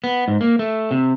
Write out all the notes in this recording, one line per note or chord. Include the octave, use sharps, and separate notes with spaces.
B3
G#2
A#3
A3
C3